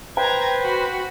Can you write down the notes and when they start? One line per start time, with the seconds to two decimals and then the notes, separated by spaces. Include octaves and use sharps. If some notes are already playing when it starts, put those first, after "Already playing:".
0.17 B4 C5 G5 A#5 G#6
0.63 F#4 B5